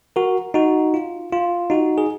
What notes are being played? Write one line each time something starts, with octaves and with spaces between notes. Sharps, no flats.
F#4 A#4
D#4 F#4
F4
F4
D#4 F#4
G#4